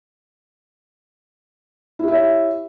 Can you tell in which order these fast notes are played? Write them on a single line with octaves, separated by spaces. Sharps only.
E4 G4 E5 C#5